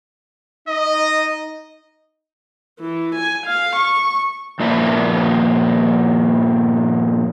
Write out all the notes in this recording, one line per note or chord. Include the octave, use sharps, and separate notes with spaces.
D#4 D#5
E3
G#5
F5
C#6
G2 A#2 F3 A#3 E4 F4